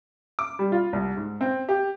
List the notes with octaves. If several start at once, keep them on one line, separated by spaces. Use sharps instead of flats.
D6
G3
F4
C2
G#2
C4
G4